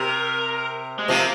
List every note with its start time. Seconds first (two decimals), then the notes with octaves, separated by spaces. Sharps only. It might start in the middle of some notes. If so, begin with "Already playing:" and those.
Already playing: C3 A#4
0.99 G#3
1.08 C3 F3 A#3